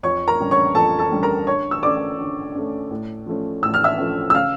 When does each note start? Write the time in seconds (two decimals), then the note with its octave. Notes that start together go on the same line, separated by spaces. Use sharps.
0.03 F2 C#5 C#6
0.27 A#4 A#5
0.39 D3 G3 C#4
0.51 C#5 C#6
0.75 F2 A4 A5
0.99 A4 A5
1.11 D3 G3 C#4
1.23 A#4 A#5
1.47 D3 C#5 C#6
1.71 E6
1.83 A3 C#4 D5 D6
2.19 D3
2.55 A3 C#4
2.91 A2
3.26 F3 A3 C#4
3.63 A2 E6
3.74 F6
3.84 E5 E6
3.99 F3 A3 C#4
4.30 E6
4.34 C#3 F5 F6